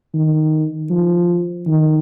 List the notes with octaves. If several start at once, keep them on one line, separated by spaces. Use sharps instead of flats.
D#3
F3
D#3